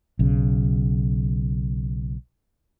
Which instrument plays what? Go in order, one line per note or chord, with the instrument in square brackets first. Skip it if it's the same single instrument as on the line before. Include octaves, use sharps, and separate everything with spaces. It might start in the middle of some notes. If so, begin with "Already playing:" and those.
[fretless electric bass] B1 C#3